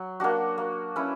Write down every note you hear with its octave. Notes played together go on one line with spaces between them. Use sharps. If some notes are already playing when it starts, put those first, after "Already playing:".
Already playing: F#3
A#3 D4 F#4
A#3
C#4 E4 B4